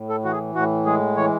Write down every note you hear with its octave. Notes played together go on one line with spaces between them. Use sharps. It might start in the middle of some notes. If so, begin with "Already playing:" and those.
Already playing: A2
A4
E3 F#4
G#4
A2 F#4
G#3 G#4
E3 C#5